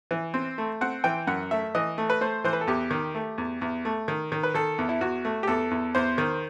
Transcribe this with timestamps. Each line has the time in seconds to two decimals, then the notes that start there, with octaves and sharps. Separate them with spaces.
0.11 E3
0.34 C4
0.58 A3
0.81 C4 F#5
1.04 E3 G5
1.27 F#2 F#5
1.51 A3 E5
1.75 E3 D#5
1.98 A3
2.10 B4
2.21 A3 C5
2.44 E3 C5
2.53 B4
2.61 A4
2.67 E2 G4
2.91 D#3
3.15 A3
3.38 E2
3.62 E2
3.85 A3
4.08 D#3
4.32 D#3
4.43 B4
4.54 D#3 A4
4.78 E2
4.89 E4
5.01 E2 F#4
5.25 A3
5.43 G4
5.48 E2 A4
5.71 E2
5.95 E2 C5
6.18 D#3